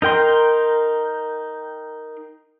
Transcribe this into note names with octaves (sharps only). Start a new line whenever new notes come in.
D#4 A#4 G5 C6